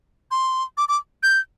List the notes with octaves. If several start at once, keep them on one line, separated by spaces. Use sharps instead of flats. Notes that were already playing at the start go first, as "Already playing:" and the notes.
C6
D6
D6
G6